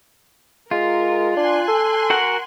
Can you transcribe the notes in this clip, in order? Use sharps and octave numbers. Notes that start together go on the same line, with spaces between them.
G#3 F4 A#4
D4 G#5 C6 F#6
A4
F#4 A#4 F#5